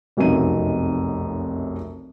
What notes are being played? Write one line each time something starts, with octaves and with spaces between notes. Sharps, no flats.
F1 B1 F#2 C3 D#4 D#7